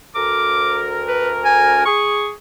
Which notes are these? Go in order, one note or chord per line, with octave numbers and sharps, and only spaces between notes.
D2 A#4 D6
B4
G#5
G#4 C#6